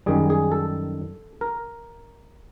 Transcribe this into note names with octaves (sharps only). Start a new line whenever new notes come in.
F#2 D#3 G3 G#4
G#4
A4
A#4